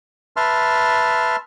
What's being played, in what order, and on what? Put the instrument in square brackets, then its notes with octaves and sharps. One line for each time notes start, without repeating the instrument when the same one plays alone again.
[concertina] B4 E5 A5 C6 F6